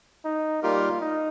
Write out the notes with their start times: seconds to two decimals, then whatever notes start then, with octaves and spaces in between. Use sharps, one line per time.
0.24 D#4
0.63 G3 A#3 D#4 F4 G4 A#4
1.00 D#4